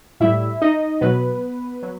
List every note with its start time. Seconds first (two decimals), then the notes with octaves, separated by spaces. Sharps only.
0.20 A2 G3 E4 E5
0.62 D#4 D#5
1.01 B2 F#3 B3 B4
1.82 F#3